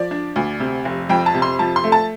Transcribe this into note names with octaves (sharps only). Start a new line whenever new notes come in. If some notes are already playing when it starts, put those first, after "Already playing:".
Already playing: F3 D5
D4
D2
C3
F1
F2 G5
A5
C3
C6
F3 A5
C6
A3
A5